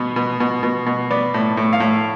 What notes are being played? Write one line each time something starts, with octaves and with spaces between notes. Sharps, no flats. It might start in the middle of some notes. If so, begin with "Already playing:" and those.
Already playing: B2 B3
B2
B2
B2
B2
B3 D5
A2
A2
F5
A2